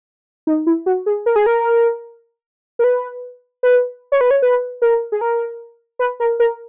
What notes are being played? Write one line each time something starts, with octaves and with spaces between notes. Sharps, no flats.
D#4
E4
F#4
G#4
A#4
G#4
A#4
A#4
B4
B4
C#5
B4
C#5
B4
A#4
G#4
A#4
B4
A#4
A#4